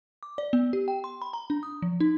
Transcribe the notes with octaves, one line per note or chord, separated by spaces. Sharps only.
D6
D5
B3
G4
G5
C6
B5
A#5
D4
D#6
F3
D#4